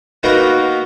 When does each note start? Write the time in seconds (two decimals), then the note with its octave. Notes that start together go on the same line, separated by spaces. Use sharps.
0.23 A#3 B3 D#4 F#4 A#4 B4